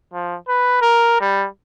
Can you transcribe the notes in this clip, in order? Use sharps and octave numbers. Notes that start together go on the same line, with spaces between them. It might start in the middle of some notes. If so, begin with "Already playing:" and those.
F3
B4
A#4
G3